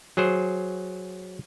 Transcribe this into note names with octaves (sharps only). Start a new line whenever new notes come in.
F#3 G#4 C5